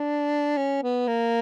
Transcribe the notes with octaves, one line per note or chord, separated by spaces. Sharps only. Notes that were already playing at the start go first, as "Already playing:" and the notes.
Already playing: D4
C#4
B3
A#3